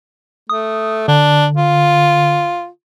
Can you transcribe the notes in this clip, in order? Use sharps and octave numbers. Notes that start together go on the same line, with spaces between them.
A3 D#6
D3 D4
F4